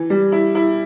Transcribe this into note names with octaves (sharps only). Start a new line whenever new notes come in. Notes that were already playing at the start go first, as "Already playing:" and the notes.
Already playing: E3
G3
E4
E4